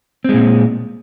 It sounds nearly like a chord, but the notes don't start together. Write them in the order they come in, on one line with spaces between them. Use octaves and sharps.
C4 G#3 A#2